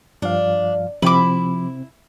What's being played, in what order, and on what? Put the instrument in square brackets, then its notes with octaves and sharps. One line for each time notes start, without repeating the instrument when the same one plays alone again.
[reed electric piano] G2 F3 F5 [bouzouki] D4
[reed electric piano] C3 C4 [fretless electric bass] F3 [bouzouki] E4 [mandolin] B5 D6